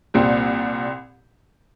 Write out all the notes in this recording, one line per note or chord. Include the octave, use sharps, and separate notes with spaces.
C2 A#2 G3 C4 G4